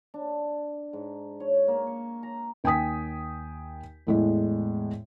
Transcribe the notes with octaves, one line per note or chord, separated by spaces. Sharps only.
D4
G#2
C#5
A#3
C#6
A#5
D#2 G5 G#5 D#6 B6
E2 A2 G#3